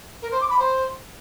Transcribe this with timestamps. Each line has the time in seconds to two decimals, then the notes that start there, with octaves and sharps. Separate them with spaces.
0.22 A#4
0.31 C5
0.40 D6
0.50 B5
0.59 C5